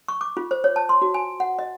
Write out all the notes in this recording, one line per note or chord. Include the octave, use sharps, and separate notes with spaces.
C#6
D6
F4
C5
C#5
A5
C6
F#4
G#5
F#5
D#5